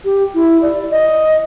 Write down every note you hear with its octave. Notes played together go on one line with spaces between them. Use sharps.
G4
E4
D5
D#5